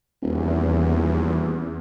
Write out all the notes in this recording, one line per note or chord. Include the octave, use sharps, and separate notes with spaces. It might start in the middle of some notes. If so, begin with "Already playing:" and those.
D#1 E2